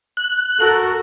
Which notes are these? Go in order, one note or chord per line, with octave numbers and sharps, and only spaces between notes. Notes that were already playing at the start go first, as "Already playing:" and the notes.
F#6
F#4 A4 A#4